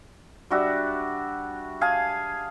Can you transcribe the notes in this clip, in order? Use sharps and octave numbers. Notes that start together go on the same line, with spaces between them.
G3 D4 F#4 E5
G#4 F5 G#5 A5